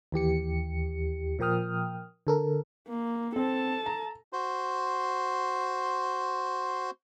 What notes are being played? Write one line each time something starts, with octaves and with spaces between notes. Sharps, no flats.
D#2 E3 G4 C#7
A#2 F3 A#4 G5 D#6 F6
D3 A4 A#4
A#3
C4 A4 A5
A#5
F#4 C5 C6